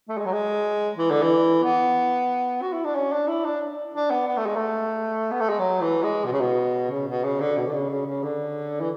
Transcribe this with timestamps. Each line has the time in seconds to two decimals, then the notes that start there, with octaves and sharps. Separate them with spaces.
0.09 A3
0.18 G#3
0.25 F#3
0.33 G#3
0.98 E3
1.11 D3
1.22 E3
1.64 B3
2.62 F#4
2.73 E4
2.85 D4
2.95 C#4
3.12 D4
3.28 E4
3.45 D4
3.95 D4
4.11 B3
4.27 B3
4.37 A3
4.46 G#3
4.56 A3
5.31 B3
5.41 A3
5.49 G#3
5.59 F#3
5.81 E3
6.03 G#3
6.25 B2
6.33 C#3
6.41 B2
6.91 C#3
7.07 B2
7.24 C#3
7.40 D3
7.57 B2
7.68 D3
7.74 C#3
7.90 C#3
8.07 C#3
8.24 D3
8.81 E3